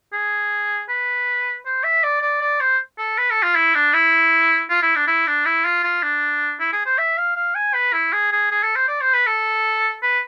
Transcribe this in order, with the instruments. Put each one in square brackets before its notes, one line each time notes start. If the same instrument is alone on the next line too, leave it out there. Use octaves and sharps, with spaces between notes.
[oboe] G#4
B4
C5
E5
D5
D5
D5
C5
A4
B4
A4
F4
E4
D4
E4
F4
E4
D4
E4
D4
E4
F4
F4
D4
E4
G#4
C5
E5
F5
F5
G#5
B4
E4
G#4
G#4
G#4
A4
C5
D5
C5
B4
A4
B4